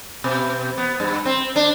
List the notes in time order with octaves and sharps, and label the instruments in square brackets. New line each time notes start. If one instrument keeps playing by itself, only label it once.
[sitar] B2
B3
G2
C4
D4